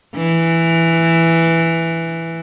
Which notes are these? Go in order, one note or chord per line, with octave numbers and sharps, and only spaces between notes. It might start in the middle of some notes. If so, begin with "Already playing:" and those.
E3